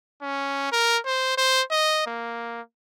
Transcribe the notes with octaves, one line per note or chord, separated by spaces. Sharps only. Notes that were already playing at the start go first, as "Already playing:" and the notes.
C#4
A#4
C5
C5
D#5
A#3